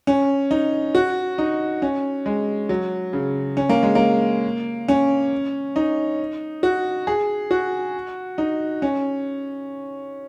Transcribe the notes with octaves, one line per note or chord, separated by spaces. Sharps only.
C#4
D#4
F#4
D#4
C#4
G#3
F#3
C#3
C#4
A#3
G#3
A#3
C#4
D#4
F#4
G#4
F#4
D#4
C#4